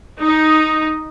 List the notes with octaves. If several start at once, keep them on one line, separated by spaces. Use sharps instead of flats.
D#4